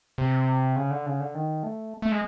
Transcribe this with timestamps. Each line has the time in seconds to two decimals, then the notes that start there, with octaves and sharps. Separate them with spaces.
0.18 C3
0.76 C#3
0.91 D3
1.06 C#3
1.20 D3
1.35 D#3
1.63 A3
2.02 A3
2.12 G#3